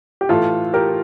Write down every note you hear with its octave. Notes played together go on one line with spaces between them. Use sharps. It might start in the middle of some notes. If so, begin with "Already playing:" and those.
G4
A2 E3 F4 A4
G4 A#4